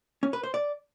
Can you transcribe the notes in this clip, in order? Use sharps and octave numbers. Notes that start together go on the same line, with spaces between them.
C#4
B4
C5
D5